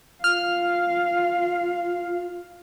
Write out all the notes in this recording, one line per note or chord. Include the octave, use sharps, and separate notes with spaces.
F4 F5 F6